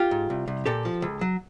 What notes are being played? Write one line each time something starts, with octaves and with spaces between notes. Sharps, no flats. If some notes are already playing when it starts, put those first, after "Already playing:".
Already playing: F4 G4
G#2
C2
C2
A#2 G4 A4
F3
C#2
F#3